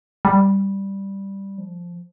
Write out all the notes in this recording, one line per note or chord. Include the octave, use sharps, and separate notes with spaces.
G3
F3